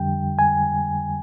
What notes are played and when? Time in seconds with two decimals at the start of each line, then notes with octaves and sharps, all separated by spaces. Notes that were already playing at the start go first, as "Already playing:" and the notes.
Already playing: F2 D3 G3 G5
0.39 G#5